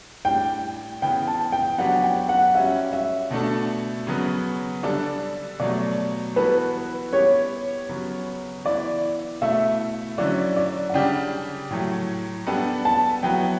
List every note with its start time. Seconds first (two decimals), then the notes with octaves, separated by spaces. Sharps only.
0.25 A2 G3 D4 G5
1.02 C#3 E3 B3 G5
1.27 A5
1.52 G5
1.78 F#3 B3 D4 G4 F#5
2.03 G5
2.29 F#5
2.55 G3 C#4 F#4 E5
2.93 E5
3.31 B2 A3 D4 A4
4.07 C#3 F#3 B3
4.83 D3 G3 D4 A4 D5
5.59 B2 F#3 A3 D5
6.36 E3 G3 B3 F#4 A4 B4
7.13 G3 B3 E4 G4 C#5
7.89 C#3 F#3 B3
8.65 E3 B3 E4 D5
9.41 B2 A3 E4 A4 E5
10.18 D3 F#3 C#4 E4 D5
10.56 D5
10.89 F#5
10.94 C#3 G3 D4 G4 G5
11.70 A2 F#3 A3 G5
12.47 G3 B3 D4 A4 G5
12.85 A5
13.23 F#3 B3 E4 G5